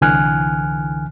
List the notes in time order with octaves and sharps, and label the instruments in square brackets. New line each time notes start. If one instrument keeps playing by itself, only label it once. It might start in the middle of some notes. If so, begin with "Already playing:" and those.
[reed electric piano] C2 D3 E3 G#5 F6 F#6